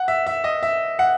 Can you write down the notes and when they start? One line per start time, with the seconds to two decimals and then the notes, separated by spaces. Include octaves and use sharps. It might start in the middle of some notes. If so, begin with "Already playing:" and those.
Already playing: F#5
0.08 E5
0.27 E5
0.44 D#5
0.63 E5
0.99 F#5